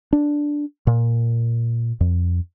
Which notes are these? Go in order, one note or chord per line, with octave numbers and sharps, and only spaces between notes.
D4
A#2
F2